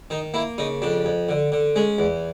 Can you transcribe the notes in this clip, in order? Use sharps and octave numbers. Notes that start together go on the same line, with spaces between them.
D#3 D#4
A#3 E4
C#3 D#4
F2 D4
F2
D3
D3
G#3 C#4
E2